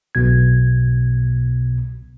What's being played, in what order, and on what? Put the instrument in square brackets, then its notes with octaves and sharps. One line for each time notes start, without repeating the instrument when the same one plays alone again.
[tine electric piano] B1 B2 G#6